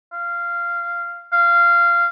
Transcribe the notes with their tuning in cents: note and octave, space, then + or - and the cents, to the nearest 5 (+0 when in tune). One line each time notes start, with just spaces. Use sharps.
F5 -15
F5 -15